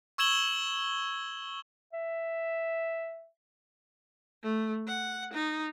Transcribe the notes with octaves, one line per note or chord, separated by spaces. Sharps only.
C#6 E6 G#6 E7 F#7 G7
E5
A3
F#5
D#4